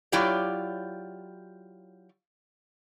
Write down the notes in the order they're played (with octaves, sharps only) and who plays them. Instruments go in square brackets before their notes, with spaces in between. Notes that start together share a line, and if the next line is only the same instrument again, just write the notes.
[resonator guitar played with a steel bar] F#3 E4 F4 G4 C#5 D5